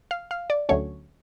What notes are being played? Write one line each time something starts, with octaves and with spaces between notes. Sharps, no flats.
F5
F5
D5
D2 D3 F#3 A3 C#4 C#5